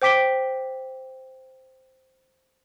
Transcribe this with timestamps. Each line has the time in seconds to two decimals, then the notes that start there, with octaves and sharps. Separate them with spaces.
0.02 C5 G5 D6 B6 D7 G7